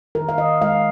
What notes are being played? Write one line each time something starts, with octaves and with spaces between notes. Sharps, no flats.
D#3 A#4
F5
D#3 D#5
G#3 F5